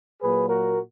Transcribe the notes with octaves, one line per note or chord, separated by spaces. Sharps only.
A#2 F#3 A#3 G#4 B4
F#4 A#4